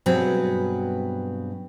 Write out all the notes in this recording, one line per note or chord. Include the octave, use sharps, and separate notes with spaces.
G2 B2 F#3 C4 G#4 B4